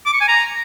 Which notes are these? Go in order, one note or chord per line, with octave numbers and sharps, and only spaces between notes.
D6
C#6
G#5
A#5